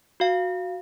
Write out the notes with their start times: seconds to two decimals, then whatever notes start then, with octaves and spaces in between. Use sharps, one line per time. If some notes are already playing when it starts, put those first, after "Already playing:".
0.20 F#4 F5